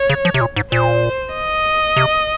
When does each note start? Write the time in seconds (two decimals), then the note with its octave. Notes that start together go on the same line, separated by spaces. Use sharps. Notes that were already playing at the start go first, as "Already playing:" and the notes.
Already playing: C#5
0.09 C#3
0.25 F3
0.34 C3
0.41 A#2
0.56 G#2
0.72 A#2 C5
1.34 D#5
1.96 C3